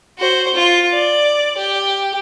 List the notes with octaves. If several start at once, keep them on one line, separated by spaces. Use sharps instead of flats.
F#4 C5
F4
D5
G4